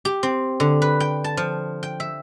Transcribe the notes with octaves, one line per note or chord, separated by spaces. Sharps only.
G4
C4
D3
B4
G5
A5
F3
G5
E5